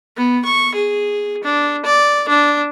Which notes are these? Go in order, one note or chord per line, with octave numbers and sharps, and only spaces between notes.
B3
C#6
G#4
D4
D5
D4